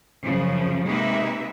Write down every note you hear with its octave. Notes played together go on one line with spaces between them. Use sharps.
F#2 C#3 F3
C3 G#3 A#3 D#4 B4 E5